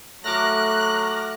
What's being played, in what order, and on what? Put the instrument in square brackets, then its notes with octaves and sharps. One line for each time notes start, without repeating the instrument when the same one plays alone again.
[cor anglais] F#3 [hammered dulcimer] A3 F#4 [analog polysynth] D6 F6 A#6 [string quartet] F#6